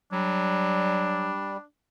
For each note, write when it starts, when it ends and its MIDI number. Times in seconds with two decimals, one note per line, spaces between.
0.12 1.34 54
0.12 1.57 55
0.12 1.63 62